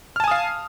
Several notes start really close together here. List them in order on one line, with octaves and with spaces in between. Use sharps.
F6 A5 G#5 D#6 F5